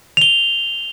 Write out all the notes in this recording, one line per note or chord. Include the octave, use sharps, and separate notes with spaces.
F7 G7